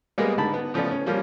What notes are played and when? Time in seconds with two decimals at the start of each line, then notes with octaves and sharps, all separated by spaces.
0.18 G3 G#3 A#3 B3 G#4 D#5
0.38 G#2 D3 A5 B5
0.54 B3
0.74 C#3 F3 A3 B3 A4 D5
0.91 C#4
1.06 F3 G3 A#3 C#4